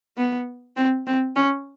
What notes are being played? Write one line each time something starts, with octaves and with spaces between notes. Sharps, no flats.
B3
C4
C4
C#4